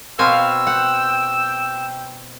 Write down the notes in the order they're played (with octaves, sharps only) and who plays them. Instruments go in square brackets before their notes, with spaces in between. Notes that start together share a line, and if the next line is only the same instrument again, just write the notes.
[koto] B2 C4 G#5 [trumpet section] F5 [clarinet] E6
[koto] F#5 [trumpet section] G5